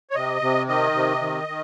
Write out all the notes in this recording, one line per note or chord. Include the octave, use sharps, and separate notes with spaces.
C#5
C3 D#5
C3
D#3 D#5
C3
D#3
D#3